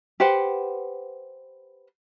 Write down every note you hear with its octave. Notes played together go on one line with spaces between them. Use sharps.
G4 B4 C5 F#5